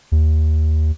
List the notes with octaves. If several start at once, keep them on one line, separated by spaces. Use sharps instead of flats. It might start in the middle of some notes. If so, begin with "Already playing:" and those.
D#2